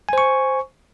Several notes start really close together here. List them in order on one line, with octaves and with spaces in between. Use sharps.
G#5 C5 C#6